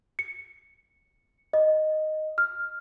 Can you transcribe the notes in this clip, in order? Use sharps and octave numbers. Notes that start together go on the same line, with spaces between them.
C#7
D#5
F6